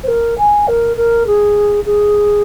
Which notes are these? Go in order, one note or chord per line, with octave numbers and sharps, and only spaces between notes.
C5
A#4
G#5
A#4
A#4
G#4
G#4